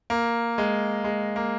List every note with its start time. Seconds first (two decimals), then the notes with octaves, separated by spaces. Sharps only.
0.10 A#3
0.58 G#3
1.04 G#3
1.36 A#3